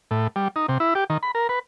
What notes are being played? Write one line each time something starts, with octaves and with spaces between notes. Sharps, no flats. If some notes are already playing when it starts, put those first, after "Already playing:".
A2
G3
D#4
C3
E4
G4
D#3
B5
A#4
B4